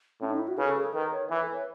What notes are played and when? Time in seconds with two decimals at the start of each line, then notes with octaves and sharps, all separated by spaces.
0.21 A2 C#4
0.30 D#4
0.39 E4
0.48 F#4
0.58 C#3 B4
0.67 A4
0.76 G#4
0.85 A4
0.94 D#3 B4
1.12 C#5
1.30 E3 B4
1.42 A4
1.48 B4
1.54 C#5